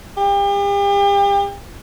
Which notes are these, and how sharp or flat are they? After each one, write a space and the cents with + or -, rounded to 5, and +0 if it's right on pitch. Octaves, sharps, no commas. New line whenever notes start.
G4 +40